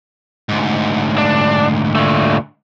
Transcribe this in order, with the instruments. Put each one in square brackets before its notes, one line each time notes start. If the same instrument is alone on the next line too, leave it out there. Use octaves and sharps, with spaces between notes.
[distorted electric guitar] D2 G#2
[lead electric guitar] D4
A#2 A3